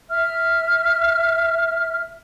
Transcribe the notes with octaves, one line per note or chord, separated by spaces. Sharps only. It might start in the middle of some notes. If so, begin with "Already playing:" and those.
E5 F6